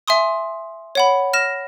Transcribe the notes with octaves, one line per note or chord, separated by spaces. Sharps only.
E5 G#5 C6 D#6
C#5 F#5 B5
F6 A#6 E7